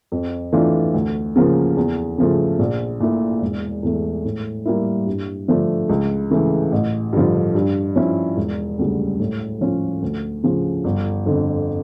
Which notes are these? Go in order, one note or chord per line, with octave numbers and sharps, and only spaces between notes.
F2
E3 A3 D4 F4
D2
C#3 F3 A#3
E2
C#3 F3 A3
A#1
A#2 A3 E4
E1
E2 E3 A3
A2
G3 A#3 E4
G2
D3 F3 A3 D4
C#2
C#3 E3 A3
A1
G2 D3 F3
G2
F3 C#4 E4
E1
D2 C#3 G3
A2
F3 C#4 F4
D2
C#3 F3
G1
F2 D3